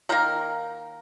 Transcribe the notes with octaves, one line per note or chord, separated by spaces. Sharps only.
D#3 A#3 A#4